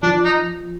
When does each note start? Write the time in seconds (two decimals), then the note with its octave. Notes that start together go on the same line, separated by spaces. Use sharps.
0.03 F3 D4
0.25 D#4